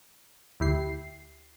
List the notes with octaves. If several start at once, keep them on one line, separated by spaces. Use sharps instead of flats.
D2 E4 G4 C7